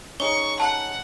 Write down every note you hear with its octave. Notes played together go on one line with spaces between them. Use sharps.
C#4 D#4 G#4 C#6 G7
F#5 A5